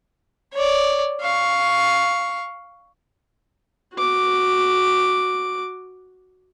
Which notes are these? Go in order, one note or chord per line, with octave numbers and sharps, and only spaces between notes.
C#5 D5
F5 C#6
F#4 D6